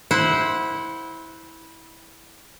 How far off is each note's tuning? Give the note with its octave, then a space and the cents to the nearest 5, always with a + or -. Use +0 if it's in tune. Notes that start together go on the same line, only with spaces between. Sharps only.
E4 -15 C5 +0 F#5 +0